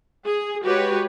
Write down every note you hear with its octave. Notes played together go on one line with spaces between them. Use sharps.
G#4
G#3 F#4 G4 B4 C#5